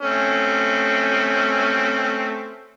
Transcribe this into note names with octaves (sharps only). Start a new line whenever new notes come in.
A3 C4 C#4